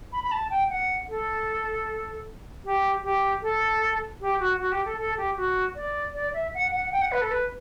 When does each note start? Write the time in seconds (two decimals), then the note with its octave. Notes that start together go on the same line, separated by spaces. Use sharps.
0.13 B5
0.24 B5
0.32 A5
0.50 G5
0.70 F#5
1.09 A4
2.65 G4
3.03 G4
3.42 A4
4.21 G4
4.40 F#4
4.60 F#4
4.72 G4
4.85 A4
4.98 A4
5.17 G4
5.37 F#4
5.76 D5
6.14 D5
6.34 E5
6.54 F#5
6.73 F#5
6.92 G5
7.02 F#5
7.12 B4
7.22 A4
7.31 B4